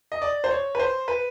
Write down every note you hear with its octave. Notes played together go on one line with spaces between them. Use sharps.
D#5
D5
C5
C#5
B4
C5
B4